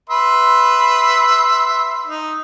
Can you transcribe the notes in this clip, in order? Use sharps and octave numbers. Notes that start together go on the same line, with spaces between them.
B4 E5 C6
D#4